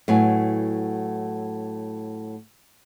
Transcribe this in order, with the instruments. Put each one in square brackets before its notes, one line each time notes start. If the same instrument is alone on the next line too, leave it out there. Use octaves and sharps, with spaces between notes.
[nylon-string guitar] A2 F#3 B3 E4 G#5